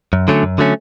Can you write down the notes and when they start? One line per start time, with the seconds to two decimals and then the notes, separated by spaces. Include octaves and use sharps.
0.13 F#2
0.28 D3 F#3 A3 C#4
0.43 F#2
0.58 D3 F#3 A3 C#4